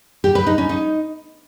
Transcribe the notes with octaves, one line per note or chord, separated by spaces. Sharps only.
G4
B4
D#4
C#4
D#4